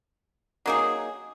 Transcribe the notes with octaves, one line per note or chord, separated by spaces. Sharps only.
F#3 A#3 D#4 G#4